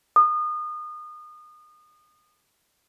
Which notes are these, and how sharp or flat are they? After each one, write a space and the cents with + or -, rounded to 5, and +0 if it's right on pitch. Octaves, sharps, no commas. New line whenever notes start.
D#6 -30